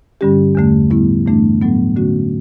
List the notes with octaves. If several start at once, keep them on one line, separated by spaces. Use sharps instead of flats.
G2 D3 G3 C#4 G4
E2 D3 A3
A2 G3 B3 E4
G2 E3 A3 D4
A2 F#3 B3
D3 A3 C#4 F#4